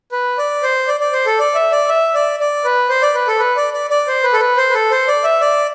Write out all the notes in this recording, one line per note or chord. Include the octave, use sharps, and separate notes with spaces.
B4
D5
C5
D5
D5
C5
A4
D5
E5
D5
E5
D5
D5
B4
C5
D5
B4
A4
B4
D5
D5
D5
C5
B4
A4
B4
C5
B4
A4
C5
D5
E5
D5